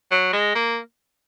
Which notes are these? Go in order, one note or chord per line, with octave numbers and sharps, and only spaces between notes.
F#3
G#3
A#3